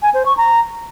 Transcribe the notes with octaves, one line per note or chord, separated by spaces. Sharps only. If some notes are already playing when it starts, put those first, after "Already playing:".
G#5
C5
C#6
A#5